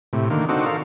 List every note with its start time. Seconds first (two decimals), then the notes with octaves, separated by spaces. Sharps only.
0.13 A2 C3
0.30 D3 D#3 A#3
0.49 C4 D4 D#4 F#4 A4
0.66 A4 A#4 F5